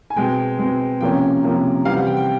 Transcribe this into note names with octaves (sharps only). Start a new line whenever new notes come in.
G#5
B2 G#3 C4 G5
B2 G#3 C4
C3 F3 A#3 C#4 G5
C3 F3 A#3 C#4
C3 E3 G3 C4 F5
F#5
G5
G5